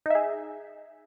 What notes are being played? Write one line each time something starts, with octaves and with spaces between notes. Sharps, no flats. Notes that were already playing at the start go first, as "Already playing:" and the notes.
D#4 G#4 E5